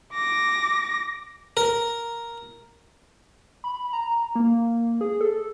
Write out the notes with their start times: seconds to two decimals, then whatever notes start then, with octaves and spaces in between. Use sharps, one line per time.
0.14 D6 A#6
1.57 A#4
3.64 B5
3.93 A#5
4.35 A#3
5.01 G#4
5.21 A4